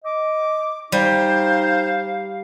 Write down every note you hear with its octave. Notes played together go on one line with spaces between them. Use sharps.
D#5 D6
G3 D#4 C5 F5